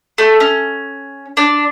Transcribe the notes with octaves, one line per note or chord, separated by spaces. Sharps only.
A3
C#4
D4